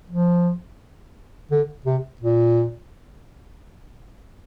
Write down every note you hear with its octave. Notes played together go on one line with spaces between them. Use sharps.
F3
D3
C3
A#2